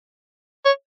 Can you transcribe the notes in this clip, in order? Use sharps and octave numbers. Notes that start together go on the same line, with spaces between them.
C#5